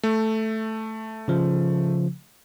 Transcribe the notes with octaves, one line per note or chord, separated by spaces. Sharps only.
A3
C#3 F3